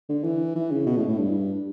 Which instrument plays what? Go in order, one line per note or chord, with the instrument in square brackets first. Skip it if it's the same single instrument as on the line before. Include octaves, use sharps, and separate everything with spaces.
[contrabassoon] D3
E3
E3
C#3
B2
A2
A2
G2